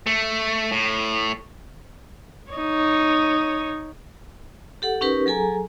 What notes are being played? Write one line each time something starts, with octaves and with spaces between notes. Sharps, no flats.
A3
A2
D#4 C#5
G4 A4 F#5
C#4 D#4 G4 A#4 B4
F#3 G#4 A4 G#5 A#5